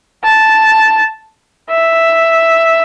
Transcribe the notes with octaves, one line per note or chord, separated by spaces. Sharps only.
A5
E5